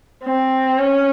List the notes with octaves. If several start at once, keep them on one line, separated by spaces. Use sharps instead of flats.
C4
C#4